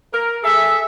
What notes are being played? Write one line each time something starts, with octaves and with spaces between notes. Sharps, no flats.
A#4
G#4 A4 E5